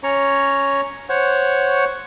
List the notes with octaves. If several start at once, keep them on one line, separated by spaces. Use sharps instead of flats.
C#4 C#5 A#5 C#6
C5 C#5 F#5 C#6